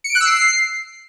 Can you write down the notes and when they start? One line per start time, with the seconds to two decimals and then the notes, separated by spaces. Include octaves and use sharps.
0.04 C#7
0.10 D7
0.15 F#6
0.20 E6
0.26 C7